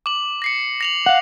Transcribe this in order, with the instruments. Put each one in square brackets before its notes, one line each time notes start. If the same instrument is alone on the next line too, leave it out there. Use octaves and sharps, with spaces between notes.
[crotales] D6 F#7
A#6 C7 C#7
A#6 F7 F#7
[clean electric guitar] F5 F#5